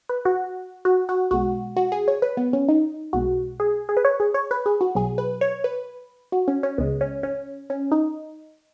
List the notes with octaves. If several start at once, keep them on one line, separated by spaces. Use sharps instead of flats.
B4
F#4
F#4
F#4
B1 B2 G#3 F#4
F#4
G#4
C#5
B4
B3
C#4
D#4
B1 B2 G#3 F#4
G#4
G#4
B4
C#5
G#4
C#5
B4
G#4
F#4
B1 B2 F#3 G#4
B4
C#5
B4
F#4
C#4
C#4
C#2 C#3 G#3 B3
C#4
C#4
C#4
D#4